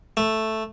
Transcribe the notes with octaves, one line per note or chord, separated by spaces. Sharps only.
A3